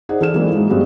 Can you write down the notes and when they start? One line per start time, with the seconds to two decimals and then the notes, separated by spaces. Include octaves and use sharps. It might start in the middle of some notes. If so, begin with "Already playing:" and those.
0.09 D#4 G#4 C5 D5 F#5
0.20 E3 A4 D5 F6 E7
0.34 E3 F#3 G#3 A#3 C4
0.52 G#2 G#3
0.70 G2 F#3 B3 C4 F#4